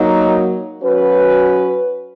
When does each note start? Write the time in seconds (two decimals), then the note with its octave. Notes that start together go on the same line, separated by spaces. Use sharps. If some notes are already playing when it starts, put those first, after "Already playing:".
Already playing: F#3 A#3 D#4
0.81 F#3 C#4 F#4 B4